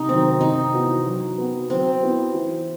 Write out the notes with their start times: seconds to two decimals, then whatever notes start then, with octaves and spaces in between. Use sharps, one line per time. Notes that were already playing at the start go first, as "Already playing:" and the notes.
Already playing: C3 D#4
0.08 D#3 F#3 C4
0.40 C3 D#4
0.73 E3 B3 F#4
1.06 F#3
1.38 B3 F#4
1.70 F#3 C4
2.03 B3 E4
2.34 E3